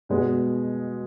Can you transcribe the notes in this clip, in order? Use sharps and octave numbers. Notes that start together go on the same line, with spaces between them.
B2 G#3 B3